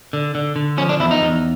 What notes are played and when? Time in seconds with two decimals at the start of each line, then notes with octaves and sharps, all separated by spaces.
0.13 D3
0.35 D3
0.56 D3
0.77 F3 C#4
0.89 D4
1.00 E2 E4
1.11 D#4
1.21 E2